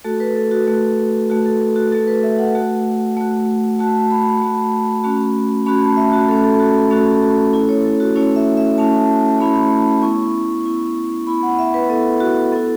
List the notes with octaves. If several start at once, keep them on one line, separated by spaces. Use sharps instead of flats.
A3 F#4 A4
B4
A4
F#4
A3 F#4
A3 F#4
A4
A4
F#4
A3 F#4 A4
B4
E5
F#5
A3 F#4
A3 F#4
A3 F#4 A5
B5
A3 F#4
A3 C#4 F#4
A3 C#4 F#4 B5
A5
E5
F#4
A3 C#4 F#4 A4
A4
F#4
A4
A3 C#4 F#4 A4
F#4
A3 C#4 E4 A4
C#5
A4
F#4
A3 C#4 E4 C#5
E5
E5
A3 C#4 E4 A5
A3 C#4 E4 B5
B3 E4 C#6
B3 E4
B3 E4 B5
F#5
E5
B4
B3 E4 A4
F#4
B3 E4 A4